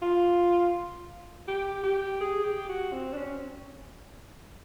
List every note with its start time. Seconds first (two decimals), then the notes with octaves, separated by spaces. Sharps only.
0.02 F4
1.48 G4
1.83 G4
2.21 G#4
2.44 G4
2.69 F#4
2.93 C4
3.13 D4
3.17 C#4